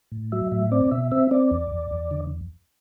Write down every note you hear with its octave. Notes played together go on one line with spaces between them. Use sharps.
A2
F#3 E5
A2 E5
C4 D5
B2 E5
C4 E5
C4 D5
E2
E2
E2
D3